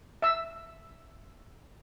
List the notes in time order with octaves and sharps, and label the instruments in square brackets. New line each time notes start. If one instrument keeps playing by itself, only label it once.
[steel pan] E5 E6